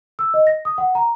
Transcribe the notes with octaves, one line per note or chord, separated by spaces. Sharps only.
E6
D#5
A#6
D#6
F#5
A#5